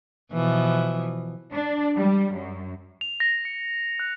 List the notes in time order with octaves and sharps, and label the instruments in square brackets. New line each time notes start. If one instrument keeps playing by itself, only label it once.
[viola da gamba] B2 E3 F3
[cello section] D4
G3
F#2
[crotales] F7
A#6
C#7
F#6